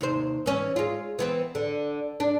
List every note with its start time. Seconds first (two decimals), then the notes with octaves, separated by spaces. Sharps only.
0.01 D#2 C3 C5
0.46 E3 C#4
0.76 G#3 F4
1.19 E3 B3 C4
1.55 D3
2.20 D4